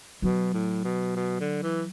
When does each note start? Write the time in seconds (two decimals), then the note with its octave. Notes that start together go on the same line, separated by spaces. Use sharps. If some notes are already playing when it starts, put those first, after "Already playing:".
0.22 B2 F#3
0.54 A2
0.84 B2
1.16 B2
1.40 D3
1.62 E3